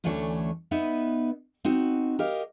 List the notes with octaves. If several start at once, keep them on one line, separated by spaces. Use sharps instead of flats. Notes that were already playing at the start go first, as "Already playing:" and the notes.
D2 E3 A3 C#4 D4 C#5
B3 D#4 B4 E5
C4 D#4 F#4
G4 A#4 D#5 F5